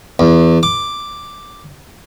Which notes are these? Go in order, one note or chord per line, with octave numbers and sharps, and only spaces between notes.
E2
D6